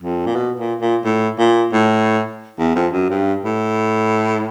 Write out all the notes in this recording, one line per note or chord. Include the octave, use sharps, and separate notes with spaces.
F2
A#2
B2
A#2
A#2
A2
A#2
A2
E2
F2
F#2
G2
A2